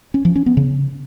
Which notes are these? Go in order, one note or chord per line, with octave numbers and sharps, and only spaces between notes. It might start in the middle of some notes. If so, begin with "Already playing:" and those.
C#4
F3
C#4
B3
C#3